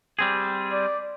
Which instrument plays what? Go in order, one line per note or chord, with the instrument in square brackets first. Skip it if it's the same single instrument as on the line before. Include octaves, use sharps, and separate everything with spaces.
[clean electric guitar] G3 C4 G#4
[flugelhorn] D5